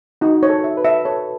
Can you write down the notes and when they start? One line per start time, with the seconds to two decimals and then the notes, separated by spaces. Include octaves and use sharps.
0.21 D#4 F#4
0.43 C#5
0.50 A4
0.64 E5
0.77 B4
0.85 E5
1.05 A4 C#5